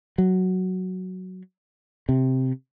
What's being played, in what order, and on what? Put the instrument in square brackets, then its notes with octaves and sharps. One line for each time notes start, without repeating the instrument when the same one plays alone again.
[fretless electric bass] F#3
C3